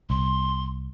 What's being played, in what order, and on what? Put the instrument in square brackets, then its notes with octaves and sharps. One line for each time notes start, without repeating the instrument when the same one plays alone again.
[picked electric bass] C2 [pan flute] C6